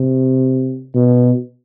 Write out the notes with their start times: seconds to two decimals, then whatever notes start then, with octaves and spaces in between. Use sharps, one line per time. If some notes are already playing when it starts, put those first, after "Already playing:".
Already playing: C3
0.95 B2